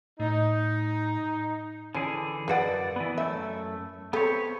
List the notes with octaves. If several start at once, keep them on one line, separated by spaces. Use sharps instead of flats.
A2 D#4
D3 E3 C#4 G#4
F#2 F#4 A#4 B4 D5 F#5
E3 B3
F#2 A3 E5
B3 C4 G4 A4 C#5